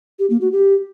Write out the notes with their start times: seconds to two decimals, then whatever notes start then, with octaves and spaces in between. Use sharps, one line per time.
0.19 G4
0.30 A#3
0.41 F#4
0.52 G4